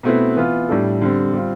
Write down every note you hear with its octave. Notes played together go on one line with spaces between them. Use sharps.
B2 A3 C4 E4 B4
E3 B3 F4
A2 G3 D4 A4
D3 G3 C4
G3 C4 F4